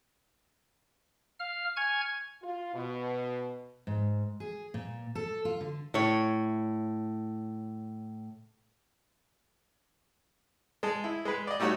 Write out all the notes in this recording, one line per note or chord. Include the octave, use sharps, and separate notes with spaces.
F5 F6
G#5 C#6 F6 G#6
F4
B2
G#2
G#4
A#2
A4
F4
D3
A2 C#5
G#3 A5
E4
G#3 B4
D5 D#5
G3 A3 D#4 F#4 C#5